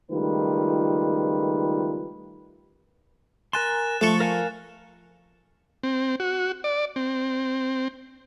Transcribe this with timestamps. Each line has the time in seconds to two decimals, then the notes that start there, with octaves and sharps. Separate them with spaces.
0.12 C#2 D#3 G3 A3 F4 B4
3.53 A#4 G#5 C6 F#6 A6 E7
4.01 F3 A3 A4 C#6
4.20 A#4 F5 G#5
5.83 C4
6.20 F#4
6.64 D5
6.96 C4